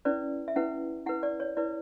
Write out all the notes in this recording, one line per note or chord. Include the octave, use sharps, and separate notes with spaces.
C#4 E4 B4 D5
E5
C#4 E4 B4 F#5
E4 B4 F#5
D5
C#5
E4 B4 D5